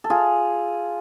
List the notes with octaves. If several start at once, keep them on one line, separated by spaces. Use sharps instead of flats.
A4
F4 G#4